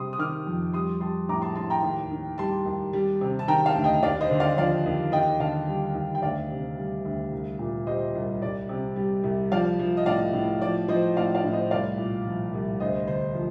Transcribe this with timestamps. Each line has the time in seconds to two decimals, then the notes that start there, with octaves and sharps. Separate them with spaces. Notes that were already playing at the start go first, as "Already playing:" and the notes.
Already playing: C3 G3 C6 D#6
0.13 D#6
0.18 D#3 D6 F6
0.46 F2
0.73 G3 C6 D#6
1.01 G3 A5 C6
1.28 A2 A#5 D6
1.42 A5 C6
1.55 A2 A5 C6
1.70 G5 A#5
1.83 D#2
2.11 D#3
2.38 G3 A5 C6
2.66 D#2
2.93 G3
3.21 C3
3.39 A5
3.48 D#3 G5 A#5
3.66 F5 A5
3.75 D2
3.84 D#5 G5
4.03 D#2 D5 F5
4.21 C5 D#5
4.31 D3
4.40 D5 F5
4.57 F3 D5 F5
4.86 D#2
5.12 D#2 D#5 G5
5.40 D3 F5 A5
5.68 G3
5.95 D#2
6.15 G5
6.22 D2 D5 F5
6.50 C3
6.78 G3
7.05 D2
7.32 C2
7.59 A#2
7.87 G3 C5 D#5
8.15 C2
8.42 C2 D5
8.69 C3
8.96 G3
9.24 C2
9.52 F3 D5 F5
9.79 F3
9.97 D#5
10.06 A2 D5 F5
10.33 A2
10.61 F3 D5
10.88 F3 C5 D#5
11.17 A2 D5 F5
11.35 D5 F5
11.44 A2
11.53 C5 D#5
11.71 C2 D5 F5
11.98 A#2
12.26 F3
12.54 C2
12.80 D2 C5 D#5
13.08 D3 C5
13.35 F3